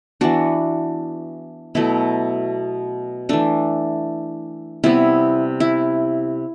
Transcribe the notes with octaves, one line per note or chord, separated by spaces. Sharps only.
E3 B3 D4 F#4
B2 F#3 A3 E4
E3 A3 D4
C3 G3 B3 E4
E4